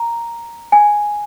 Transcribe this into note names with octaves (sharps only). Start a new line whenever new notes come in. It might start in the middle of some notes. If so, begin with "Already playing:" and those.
Already playing: A#5
G#5